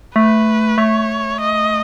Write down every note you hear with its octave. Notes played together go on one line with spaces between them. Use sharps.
A3 B4
A3 C#5
D#5